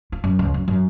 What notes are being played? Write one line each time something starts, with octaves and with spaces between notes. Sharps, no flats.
F4
F#2
C#2
F#2
F#2